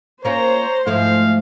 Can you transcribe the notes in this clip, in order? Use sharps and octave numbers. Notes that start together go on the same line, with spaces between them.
A#3 C#4 F4 C5 C#5 A#5
G#2 F3 G#3 A3 E4 F5